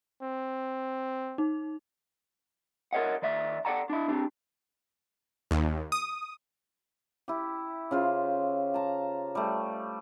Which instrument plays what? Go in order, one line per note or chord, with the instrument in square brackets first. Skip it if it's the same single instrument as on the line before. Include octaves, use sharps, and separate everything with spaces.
[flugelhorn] C4
[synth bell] D#4
[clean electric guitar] A#4 B4 C#5 D#5 F#5
D#3 D5 E5
A4 C5 D5 F#5 A5 A#5
D4 E4
C4 D4 G4
[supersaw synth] D#2
D#6
[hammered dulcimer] E4 G4
C#3 F4 C5
A5 A#5
G3 A3